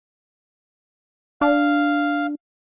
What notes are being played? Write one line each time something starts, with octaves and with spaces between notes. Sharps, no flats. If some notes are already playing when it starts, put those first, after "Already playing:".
D4 F5